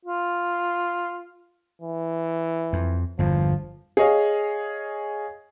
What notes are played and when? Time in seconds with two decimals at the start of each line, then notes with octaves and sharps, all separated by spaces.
0.05 F4
1.82 E3
2.73 F2
3.19 G1 E2 F3
3.97 G#4 C#5 D#5 F5